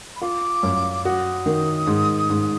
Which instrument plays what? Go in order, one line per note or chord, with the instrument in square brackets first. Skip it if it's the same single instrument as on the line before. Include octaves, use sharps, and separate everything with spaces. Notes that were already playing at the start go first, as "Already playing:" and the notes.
[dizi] B5
[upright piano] F4 [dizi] D6
[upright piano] F#2
[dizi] D6
[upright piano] F#4 [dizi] D#6
[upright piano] D#3
G#2
G#2